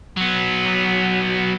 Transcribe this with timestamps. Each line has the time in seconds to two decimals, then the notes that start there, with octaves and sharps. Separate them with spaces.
0.17 F#3 B3